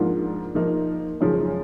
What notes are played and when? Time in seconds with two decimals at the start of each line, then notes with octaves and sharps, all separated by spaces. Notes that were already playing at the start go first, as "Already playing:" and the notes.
Already playing: G#2 F3 A#3 D4 F4
0.55 F3 A#3 D#4
1.21 F#2 C#3 F3 G#3 C#4